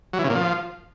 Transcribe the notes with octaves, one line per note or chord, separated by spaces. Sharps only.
F#3
E3
C#3
A#2
F3